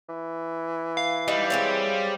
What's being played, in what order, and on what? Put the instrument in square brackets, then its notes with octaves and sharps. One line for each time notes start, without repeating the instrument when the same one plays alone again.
[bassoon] E3
[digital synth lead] F5
[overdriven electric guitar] G3 [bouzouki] D#4
[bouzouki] G#3 C4 C#5